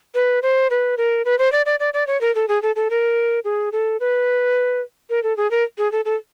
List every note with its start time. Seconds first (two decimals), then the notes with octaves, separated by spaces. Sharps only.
0.15 B4
0.43 C5
0.70 B4
0.97 A#4
1.25 B4
1.39 C5
1.52 D5
1.66 D5
1.80 D5
1.94 D5
2.07 C#5
2.21 A#4
2.35 A4
2.48 G#4
2.62 A4
2.76 A4
2.90 A#4
3.45 G#4
3.72 A4
4.00 B4
5.10 A#4
5.23 A4
5.37 G#4
5.51 A#4
5.78 G#4
5.92 A4
6.05 A4